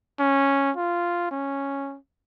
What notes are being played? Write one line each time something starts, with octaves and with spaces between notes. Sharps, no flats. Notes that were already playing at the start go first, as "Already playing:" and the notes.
C#4
F4
C#4